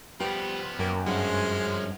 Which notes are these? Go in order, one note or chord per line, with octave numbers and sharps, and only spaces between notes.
F3 G3 B3 B4 G5
F#2 A#3 G5
G2 F3 G#3 C#4 F#5